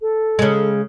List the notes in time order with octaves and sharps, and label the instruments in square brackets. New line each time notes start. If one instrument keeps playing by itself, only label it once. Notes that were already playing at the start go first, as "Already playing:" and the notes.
[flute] A4
[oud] C#3 G#3